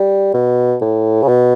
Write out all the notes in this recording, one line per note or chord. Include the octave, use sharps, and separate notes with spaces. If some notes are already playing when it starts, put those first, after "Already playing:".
Already playing: G3
B2
A2
C#3
B2